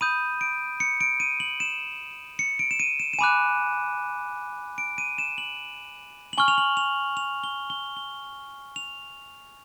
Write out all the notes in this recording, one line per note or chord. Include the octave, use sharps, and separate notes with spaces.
B5 D#6 G6 D#7
D7
C#7
D7
D#7
F#7
E7
C#7
D7
E7
D#7
E7
E7
G#5 B5 D6 F#6 D#7
D7
D#7
E7
F#7
F#7
G#5 C#6 F6 G7
F7
F#7
F7
F7
G7
G7
G7
F7